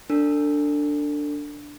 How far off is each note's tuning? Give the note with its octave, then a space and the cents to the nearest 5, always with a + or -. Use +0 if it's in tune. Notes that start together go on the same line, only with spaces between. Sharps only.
D4 +0 A4 +35